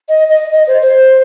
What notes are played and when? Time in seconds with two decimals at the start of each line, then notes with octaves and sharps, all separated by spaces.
0.09 D#5
0.31 D#5
0.53 D#5
0.67 C5
0.82 C5